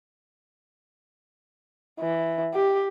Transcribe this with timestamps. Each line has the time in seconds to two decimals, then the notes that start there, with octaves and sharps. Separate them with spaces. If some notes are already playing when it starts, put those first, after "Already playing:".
2.00 E3
2.54 G4